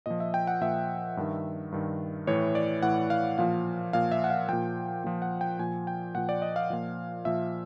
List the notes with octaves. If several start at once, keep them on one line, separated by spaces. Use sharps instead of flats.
A#2 F3 D#5
E5
G5
F#5
A#2 F3 E5
G2 D#3
G2 D#3
A2 E3 C#5
D5
A2 E3 F#5
F5
A#2 F3 F5
A#2 F3 F5
E5
F#5
F5
A#2 F3 G5
A#2 F3
F#5
G5
A#2 F3 G#5
G5
A#2 F3 F#5
D5
D#5
F5
A#2 F3
A#2 F3 E5